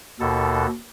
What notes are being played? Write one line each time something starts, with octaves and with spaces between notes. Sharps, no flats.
D#2 B2 A4